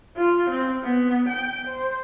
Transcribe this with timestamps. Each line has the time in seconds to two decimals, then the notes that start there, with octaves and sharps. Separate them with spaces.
0.17 F4
0.49 C4
0.84 B3
1.28 G5
1.67 C5